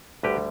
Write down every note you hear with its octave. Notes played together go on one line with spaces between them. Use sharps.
D2 D3 G3 G4 B4